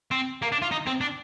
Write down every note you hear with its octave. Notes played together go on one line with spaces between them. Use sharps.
C4
A#3
D4
F4
D#4
C4
D4